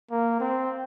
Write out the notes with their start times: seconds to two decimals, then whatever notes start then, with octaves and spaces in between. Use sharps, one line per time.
0.11 A#3
0.40 C4